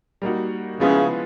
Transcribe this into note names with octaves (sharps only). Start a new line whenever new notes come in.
G3 A#3 D#4 F#4
C#3 F3 G#3 B3 E4